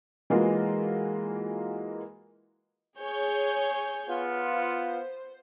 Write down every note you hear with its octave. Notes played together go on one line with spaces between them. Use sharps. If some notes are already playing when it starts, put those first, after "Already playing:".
E3 G#3 A#3 F4 F#4
G#4 C#5 G6
B3 F4
C5